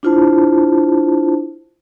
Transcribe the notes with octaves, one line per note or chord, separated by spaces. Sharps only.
D4 E4 F4 C5 A5